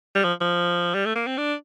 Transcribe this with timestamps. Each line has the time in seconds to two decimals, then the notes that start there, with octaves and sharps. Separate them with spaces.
0.16 G3
0.24 F3
0.41 F3
0.94 G3
1.05 A3
1.16 A#3
1.27 C4
1.37 D4